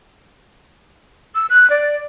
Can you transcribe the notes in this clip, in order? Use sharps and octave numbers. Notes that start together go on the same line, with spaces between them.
E6
F#6
D5